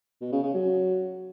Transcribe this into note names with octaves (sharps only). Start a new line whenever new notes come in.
B2
C#3
C#3
F#3